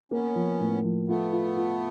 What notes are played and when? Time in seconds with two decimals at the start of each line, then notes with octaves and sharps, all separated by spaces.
0.11 A#3 B3 C#4
0.35 F3
0.60 A2
0.84 F3
1.08 A3 B3 F4
1.33 F4
1.57 F4